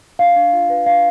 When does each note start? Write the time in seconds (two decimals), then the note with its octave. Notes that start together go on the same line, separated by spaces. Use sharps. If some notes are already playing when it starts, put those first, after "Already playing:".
0.19 D4 F5
0.36 D4
0.53 F4
0.70 B4
0.86 D4 F5